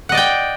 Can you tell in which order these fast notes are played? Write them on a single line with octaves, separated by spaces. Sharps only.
F#5 D#5 D5 G5